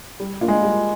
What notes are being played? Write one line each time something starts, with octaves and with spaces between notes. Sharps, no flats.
G3
A#3 D4 F4
G#3
G3